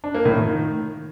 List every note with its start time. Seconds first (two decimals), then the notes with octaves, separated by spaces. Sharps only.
0.04 D4
0.14 A#3
0.25 A2
0.36 D#3